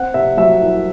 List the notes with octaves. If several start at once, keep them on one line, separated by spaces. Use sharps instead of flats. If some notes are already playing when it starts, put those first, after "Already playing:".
Already playing: C4 F#5
C3 E5
F#3 E5
C2